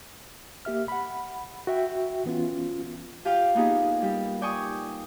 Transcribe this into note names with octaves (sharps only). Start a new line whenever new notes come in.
A#3 G4 E5 F6
F#5 B5
F#4 E5 G5
E3 B3 C#4 F4
F4 G4 F5 G5
A#3 B3 D#4 G4 G#4
G3 G4
G4 D5 G5 G#5 C#6 D#6